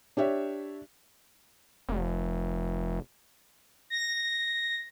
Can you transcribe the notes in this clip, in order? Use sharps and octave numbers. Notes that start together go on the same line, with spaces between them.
D4 G4 C#5 E5
F1
A#6